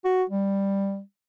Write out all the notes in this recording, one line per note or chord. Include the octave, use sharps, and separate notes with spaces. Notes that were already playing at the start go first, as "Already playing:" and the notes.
F#4
G3